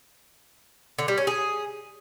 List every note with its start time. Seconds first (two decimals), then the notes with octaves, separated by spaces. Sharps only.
0.99 D3
1.08 G3
1.18 C#4
1.27 G#4